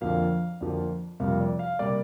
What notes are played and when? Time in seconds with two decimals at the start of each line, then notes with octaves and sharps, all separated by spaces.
0.01 F2 D3 F3 A#3 F5
0.61 F2 D3 F3 A#3
1.20 F2 C3 G3 A#3 F5
1.40 D5
1.59 F5
1.79 C3 G3 A#3 D5